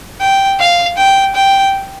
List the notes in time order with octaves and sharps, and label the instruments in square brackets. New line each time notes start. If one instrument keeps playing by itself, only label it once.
[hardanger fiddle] G5
F5
G5
G5